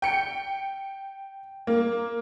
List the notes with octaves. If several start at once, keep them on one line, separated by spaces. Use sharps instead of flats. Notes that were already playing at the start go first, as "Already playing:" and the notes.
G5 C#7
A#3